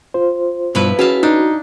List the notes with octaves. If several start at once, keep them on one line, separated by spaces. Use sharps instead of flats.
F4 C5
G2 B2 F3 E4 B4
C#4 E4 F#4 G#4 B4 F5 A5
D4 D#4